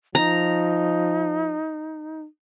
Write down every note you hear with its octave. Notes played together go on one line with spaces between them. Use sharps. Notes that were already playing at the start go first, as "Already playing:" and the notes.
F3 D#4 A#5